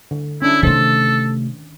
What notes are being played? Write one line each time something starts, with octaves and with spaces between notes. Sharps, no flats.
D3
C#4 D4 E4
C3 D#3 A3 A4 C5